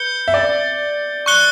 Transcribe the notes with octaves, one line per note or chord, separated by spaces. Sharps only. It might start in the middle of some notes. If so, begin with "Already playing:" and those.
Already playing: B4 G6 C#7 G7
E5
D5
C#6 F#6 C#7 G7